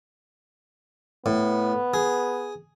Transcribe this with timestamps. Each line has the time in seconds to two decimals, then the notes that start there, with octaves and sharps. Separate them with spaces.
1.26 A2 B3
1.94 G#4